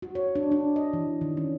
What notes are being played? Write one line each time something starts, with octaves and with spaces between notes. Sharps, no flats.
F#4
C#5
D4
D4
D#5
E3
D#3
C#4